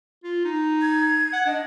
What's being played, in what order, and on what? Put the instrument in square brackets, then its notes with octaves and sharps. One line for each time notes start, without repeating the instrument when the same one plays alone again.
[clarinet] F4
D#4
[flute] G#6
[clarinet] F#5
[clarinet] D4 [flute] D#5